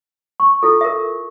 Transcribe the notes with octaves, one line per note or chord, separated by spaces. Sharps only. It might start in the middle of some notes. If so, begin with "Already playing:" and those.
C#6
E4 F4 A4
A#4 E5